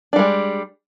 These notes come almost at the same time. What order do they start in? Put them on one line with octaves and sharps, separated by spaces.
D4 G3 G#3